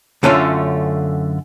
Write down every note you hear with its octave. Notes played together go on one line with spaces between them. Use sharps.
F#2 D3 A3 C#4 F4